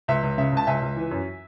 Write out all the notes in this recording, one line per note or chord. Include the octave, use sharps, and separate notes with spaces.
C#2 E5
C#2
C#3 E5
C#2 A5
C#2 E5 G#5
C#2
E3
F#2